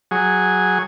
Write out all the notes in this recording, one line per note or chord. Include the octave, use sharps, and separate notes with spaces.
F#3 G#4